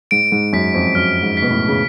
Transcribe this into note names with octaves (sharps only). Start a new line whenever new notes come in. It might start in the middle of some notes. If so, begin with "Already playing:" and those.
G#2 D7
G#2
F#2 B6
F2
F#2 F6
G#2
B6
B2
A2
C#3